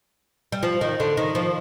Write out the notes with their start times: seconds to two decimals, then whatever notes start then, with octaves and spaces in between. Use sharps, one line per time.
0.52 G3
0.63 F3
0.81 D#3
1.00 D3
1.17 D#3
1.35 F3